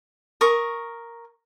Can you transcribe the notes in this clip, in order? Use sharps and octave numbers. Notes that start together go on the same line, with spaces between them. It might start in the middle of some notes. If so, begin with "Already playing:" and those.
A#4 C#6 D#6